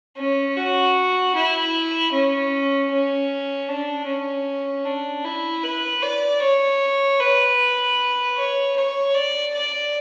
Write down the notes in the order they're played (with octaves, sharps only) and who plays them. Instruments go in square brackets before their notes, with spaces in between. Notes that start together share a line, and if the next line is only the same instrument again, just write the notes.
[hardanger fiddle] C#4
F#4
E4
C#4
C#4
D4
C#4
D4
E4
B4
D5
C#5
B4
C#5
C#5
D5
D5